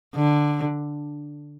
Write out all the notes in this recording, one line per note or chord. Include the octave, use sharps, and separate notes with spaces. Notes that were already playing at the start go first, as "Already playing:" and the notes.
D3